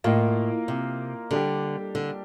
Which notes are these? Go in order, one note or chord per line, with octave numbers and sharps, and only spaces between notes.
A2 A#3 F4 A#4 D#5
C3
D3 G3 D4 G4
D3